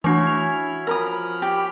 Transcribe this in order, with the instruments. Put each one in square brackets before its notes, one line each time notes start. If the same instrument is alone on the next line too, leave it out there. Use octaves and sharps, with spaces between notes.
[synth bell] E3 A3 D4 [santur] C#4 F#4 [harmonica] E4 [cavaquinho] C#5
[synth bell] G#6 F7
[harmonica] F3 B5 F6 [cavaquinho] A#4 A#5 D#6
[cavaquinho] G4